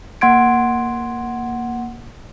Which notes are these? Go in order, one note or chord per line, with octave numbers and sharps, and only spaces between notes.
A#3 F#5 C6 G#6 D7